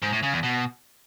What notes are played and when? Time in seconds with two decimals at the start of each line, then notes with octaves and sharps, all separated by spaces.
0.02 G#2
0.13 A2
0.23 C#3
0.33 E2
0.43 B2